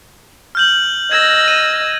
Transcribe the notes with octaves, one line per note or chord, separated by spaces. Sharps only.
F6 G6 F#7
D#5 E6 G#6 A#6
D#7